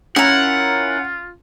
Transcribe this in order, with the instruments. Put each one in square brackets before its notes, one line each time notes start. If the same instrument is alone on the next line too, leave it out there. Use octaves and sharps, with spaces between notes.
[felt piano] C#4 [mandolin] E4 A#4 [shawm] F4 [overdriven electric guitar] F#5